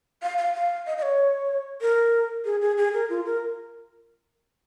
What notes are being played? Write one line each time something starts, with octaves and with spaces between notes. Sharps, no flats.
F5
F5
F5
D#5
D#5
C#5
A#4
G#4
G#4
G#4
A#4
F4
A#4